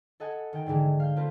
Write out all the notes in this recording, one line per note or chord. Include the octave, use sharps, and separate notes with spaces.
A4 D#5 F#5 G#5
D#3 G5 A#5
G#2 D3 E3 G#3
F5 G6
A3 A#3 C4 F4 B4